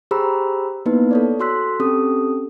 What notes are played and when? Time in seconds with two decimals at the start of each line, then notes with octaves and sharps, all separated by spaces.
0.11 G4 G#4 C5 A#5 B5 E6
0.86 A#3 B3 D#4 E4 B4
1.11 A4 C#5 D5
1.40 F#4 A4 C6 E6 F#6 B6
1.80 C4 C#4 G4 A4 D#6